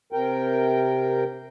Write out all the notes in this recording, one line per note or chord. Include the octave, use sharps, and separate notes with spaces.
C3 A#4 G5